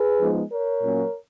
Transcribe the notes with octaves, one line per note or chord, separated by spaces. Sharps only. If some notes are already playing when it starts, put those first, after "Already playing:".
Already playing: G#4 B4
F3 G#3 B3 D#4
A#4 C#5
A#2 F#3 A#3 C#4